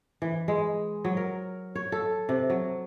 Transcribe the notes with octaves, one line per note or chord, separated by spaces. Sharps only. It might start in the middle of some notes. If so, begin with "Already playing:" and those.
E3
G#3
F#3
A#4
C#5
A4
C3
F#3